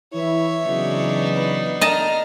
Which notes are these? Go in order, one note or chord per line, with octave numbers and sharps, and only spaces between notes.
E3 E4 C#5 E5
C#3 E3 F#3 B3 D4 D#4
B4
D#5 A5 A#5 F6